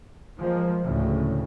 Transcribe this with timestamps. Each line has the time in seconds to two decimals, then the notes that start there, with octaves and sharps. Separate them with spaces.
0.37 F3 G#3 A#3
0.82 D2 A2 C#3